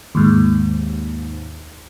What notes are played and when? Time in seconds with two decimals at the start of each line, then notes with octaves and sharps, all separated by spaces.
0.15 D#2 G#2